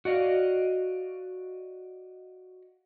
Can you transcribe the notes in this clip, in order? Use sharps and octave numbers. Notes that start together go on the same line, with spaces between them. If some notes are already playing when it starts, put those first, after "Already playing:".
F#4 D5 D#5 F5